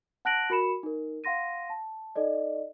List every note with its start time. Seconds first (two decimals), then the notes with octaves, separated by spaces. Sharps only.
0.25 F#5 A5 F#6 A#6 D7 F#7
0.50 F#4 A#4 B5 C#7 E7
0.83 D#4 A#4
1.24 F5 F#5 C6 A#6 D#7
1.70 A5
2.16 D#4 A4 D5 D#5